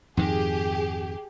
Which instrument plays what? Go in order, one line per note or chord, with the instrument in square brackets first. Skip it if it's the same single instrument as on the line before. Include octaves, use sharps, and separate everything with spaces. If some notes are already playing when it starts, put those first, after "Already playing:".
[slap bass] F2 G#2 D#3 [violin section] G4 G#4